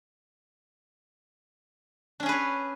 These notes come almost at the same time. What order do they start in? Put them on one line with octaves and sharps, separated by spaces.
D4 C#4 G#4 B4 C#5